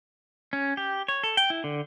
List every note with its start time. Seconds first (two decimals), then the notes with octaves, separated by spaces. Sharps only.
0.53 C#4
0.77 G4
1.08 C#5
1.23 A4
1.37 G5
1.50 E4
1.64 D3